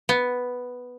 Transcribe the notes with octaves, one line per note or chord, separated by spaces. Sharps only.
B3